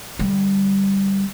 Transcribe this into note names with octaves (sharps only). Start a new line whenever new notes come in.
D3 G3